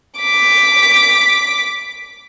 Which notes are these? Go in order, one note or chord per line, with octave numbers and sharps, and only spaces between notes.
D6 B6